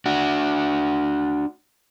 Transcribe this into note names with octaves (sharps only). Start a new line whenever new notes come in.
D4 F#4